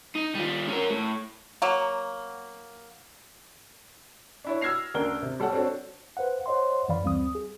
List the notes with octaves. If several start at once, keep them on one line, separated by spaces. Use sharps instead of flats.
D#4
G3 F4
C#4 A#4
A2
F#3 A#3
D4 E4 C#5
E6 F6 G#6 A#6 C7 F7
D2 C#3 D4 A#4 G7
C3
G3 A4 C#5 F#5
C4 D4 F#4 A4 C#5
B4 C5 F5 F#5
C5 C#5 D#5 F#5 C6
F#2 E3 D5 F5 B5
D2 G3 C4 D#6
G#4